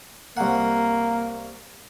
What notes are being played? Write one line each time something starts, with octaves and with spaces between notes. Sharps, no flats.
C2 A#3 F#5